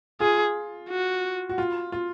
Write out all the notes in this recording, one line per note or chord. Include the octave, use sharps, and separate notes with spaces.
F4 G#4
F#4
F#4
F4
F4